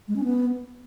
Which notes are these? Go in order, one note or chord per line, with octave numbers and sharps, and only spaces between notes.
G#3
C#4
B3